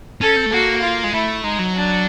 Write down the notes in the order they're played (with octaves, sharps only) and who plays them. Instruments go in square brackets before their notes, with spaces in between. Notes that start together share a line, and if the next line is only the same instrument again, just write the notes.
[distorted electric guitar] C#4 [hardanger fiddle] A4
[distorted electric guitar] C4
A3
[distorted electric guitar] A#3 [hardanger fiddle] F#4
[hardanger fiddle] F4
[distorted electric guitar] G#3
[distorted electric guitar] A3 [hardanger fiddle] E4
[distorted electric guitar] G#3 [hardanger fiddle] D#4
[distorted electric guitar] F#3
[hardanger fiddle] D4